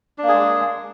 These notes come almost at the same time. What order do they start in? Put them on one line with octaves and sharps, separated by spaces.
D4 A#3 G#4 G#3